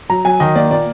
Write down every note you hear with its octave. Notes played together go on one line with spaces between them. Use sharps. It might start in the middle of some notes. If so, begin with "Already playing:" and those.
F#3 A#5
F#3 G#5
D#3 D#5
A#3 D5
A#2 D5